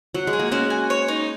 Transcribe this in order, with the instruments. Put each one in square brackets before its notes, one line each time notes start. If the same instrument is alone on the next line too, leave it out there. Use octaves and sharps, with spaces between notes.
[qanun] F#3 [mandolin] F#5
[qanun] G#3
[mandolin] G#4
[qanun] A#3
[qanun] G#3 C#4 [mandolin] F#4
[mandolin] G#5
C#5
D#4